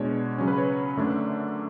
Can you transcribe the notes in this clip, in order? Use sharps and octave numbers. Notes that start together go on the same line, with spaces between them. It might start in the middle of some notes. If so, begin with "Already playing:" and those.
Already playing: B2 G#3 D4 C#5
C#3 F#3 C#4
B4
C#5
F#2 D3 A3 D4